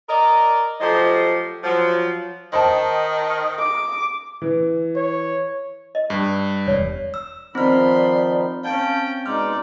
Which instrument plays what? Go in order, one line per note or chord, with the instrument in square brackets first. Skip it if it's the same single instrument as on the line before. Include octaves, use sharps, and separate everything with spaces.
[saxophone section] A#4 D5 D#5
F3 F#3 A3 G4 C5 D#5
F3 F#3
[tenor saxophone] D#3 [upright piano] C5 G5 A5 [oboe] D#5
[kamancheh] D6
[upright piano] E3
[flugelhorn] C#5
[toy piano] D#5
[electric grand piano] G2
[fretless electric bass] E1 [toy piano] C#5 D5
[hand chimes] E6
[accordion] D#3 F3 D#4 [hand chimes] C4 F6 [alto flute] D5 [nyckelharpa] B5 C6
[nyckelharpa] C#4 G5 [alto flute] F5 [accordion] A5
[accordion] B2 G#3 [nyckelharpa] D#4 D5 [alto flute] C6 [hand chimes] F6